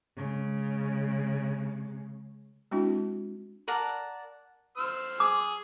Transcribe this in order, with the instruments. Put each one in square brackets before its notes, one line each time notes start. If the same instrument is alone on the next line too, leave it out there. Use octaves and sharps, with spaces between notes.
[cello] C#3 G#3
[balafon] G#3 C4 D4 E4 F#4
[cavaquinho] A#4 D5 F#5 A5
[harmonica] C5 E6 F6
[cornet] G#4 [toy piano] D6